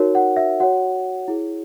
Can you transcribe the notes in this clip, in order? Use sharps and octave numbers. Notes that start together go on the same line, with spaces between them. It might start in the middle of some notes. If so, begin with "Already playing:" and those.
Already playing: D#4 F#4 A#4 C#5
F#5
E5
F#4 C#5 F#5
E4 G#4 C#5